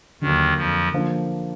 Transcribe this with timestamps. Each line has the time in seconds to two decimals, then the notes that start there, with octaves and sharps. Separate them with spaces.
0.21 D#2 D3 D#3 F#3 A#3
0.57 F2 F3
0.93 D3 F3 A#3 D4